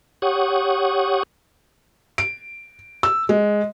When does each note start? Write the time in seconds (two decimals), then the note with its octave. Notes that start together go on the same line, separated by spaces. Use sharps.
0.22 G4 C#5 F#5 C#6 D#6
2.18 D7
3.03 E6
3.29 G#3